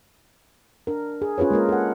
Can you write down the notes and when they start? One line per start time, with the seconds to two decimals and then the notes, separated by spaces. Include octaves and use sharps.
0.87 D4 A#4
1.22 G#4
1.38 C#4 F4 G#4 B4 C#5
1.51 G#3 A#3 F4 A#4
1.69 A4 F#5